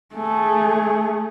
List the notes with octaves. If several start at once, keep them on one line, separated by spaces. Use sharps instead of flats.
A3 G#4